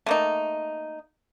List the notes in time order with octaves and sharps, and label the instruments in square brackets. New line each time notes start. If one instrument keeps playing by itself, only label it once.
[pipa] A3 A#3 D#4